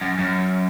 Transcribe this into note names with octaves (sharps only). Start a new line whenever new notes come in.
F#2
F#2